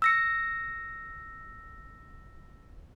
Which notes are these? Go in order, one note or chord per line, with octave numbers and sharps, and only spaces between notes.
E6 A#6 C#7